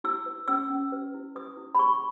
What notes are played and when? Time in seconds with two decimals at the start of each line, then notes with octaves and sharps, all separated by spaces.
0.04 E4 E6
0.26 B4
0.48 C#4 E6
0.70 C#4
0.92 B4
1.14 E4
1.35 B4 D#6
1.57 E4
1.75 B5
1.79 G#4 C#6